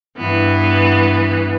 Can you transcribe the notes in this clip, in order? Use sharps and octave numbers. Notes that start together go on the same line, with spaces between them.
G2 E3 B3